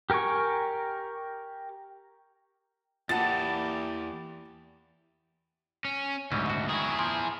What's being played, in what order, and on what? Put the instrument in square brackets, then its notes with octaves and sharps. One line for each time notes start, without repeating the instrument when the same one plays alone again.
[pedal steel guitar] G4 A#4 G5 G#5 C#6
[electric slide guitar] E2 E4 A5 [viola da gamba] A#3 G4 [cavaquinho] F#5 D#6 [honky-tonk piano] A6
[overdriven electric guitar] C#4
[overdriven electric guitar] D2 G#2 [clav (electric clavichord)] E3 F#3 G3
[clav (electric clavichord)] B2 F#4
[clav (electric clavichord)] D#3 F#3 [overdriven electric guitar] E4 G#4
[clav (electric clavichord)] A#2 F3